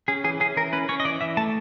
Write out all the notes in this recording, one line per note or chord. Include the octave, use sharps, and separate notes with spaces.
C#4 G#4
E3 G#4
C#4 G#4
E3 A#4
C#4 B4
C#4 C#5
D#5
E3 D5
E3 E5
A3 A5